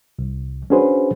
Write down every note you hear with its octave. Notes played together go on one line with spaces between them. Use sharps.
C2
C#4 D4 F#4 G#4 B4 C5